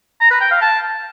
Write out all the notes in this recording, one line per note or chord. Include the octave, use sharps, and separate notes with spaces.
A#5
B4
G5
F5
A5